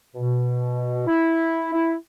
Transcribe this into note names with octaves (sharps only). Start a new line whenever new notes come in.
B2
E4
E4